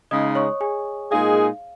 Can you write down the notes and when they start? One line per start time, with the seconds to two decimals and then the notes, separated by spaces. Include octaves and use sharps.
0.10 C#3 G#3 D#4 D#5 D#6
0.35 C#5 C#6
0.61 G#4 G#5
1.11 A#2 G#3 D#4 G#4 F5